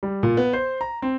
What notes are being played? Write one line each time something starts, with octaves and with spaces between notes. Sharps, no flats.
G3
A#2
B3
C5
A#5
C4